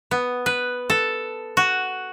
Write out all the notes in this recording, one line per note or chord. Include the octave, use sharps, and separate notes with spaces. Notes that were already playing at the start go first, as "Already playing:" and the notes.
B3
B4
A4
F#4